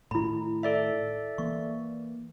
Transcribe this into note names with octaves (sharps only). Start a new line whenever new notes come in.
A2 D#3 E4 B5
A4 D5 E5
E3 A#3 C#6